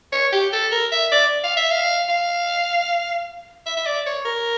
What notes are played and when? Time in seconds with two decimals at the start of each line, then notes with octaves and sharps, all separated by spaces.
0.12 C#5
0.32 G4
0.53 A4
0.72 A#4
0.92 E5
1.11 D5
1.44 F5
1.57 E5
1.71 F5
2.09 F5
3.66 E5
3.77 E5
3.86 D5
4.06 C#5
4.25 A#4